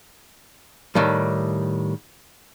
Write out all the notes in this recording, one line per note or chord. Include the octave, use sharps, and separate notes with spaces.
A2 D#3 G3